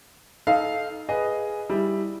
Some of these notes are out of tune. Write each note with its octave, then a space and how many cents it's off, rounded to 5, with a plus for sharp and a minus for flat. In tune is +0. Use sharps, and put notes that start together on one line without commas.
D#4 +5 A4 -20 F5 -10
G#4 +0 B4 +0 D#5 +0
G3 +0 E4 +0